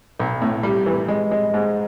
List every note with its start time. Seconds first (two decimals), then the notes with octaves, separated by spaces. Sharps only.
0.19 B1
0.42 A2
0.63 G3
0.86 E3
1.08 G#3
1.31 G#3
1.54 G#2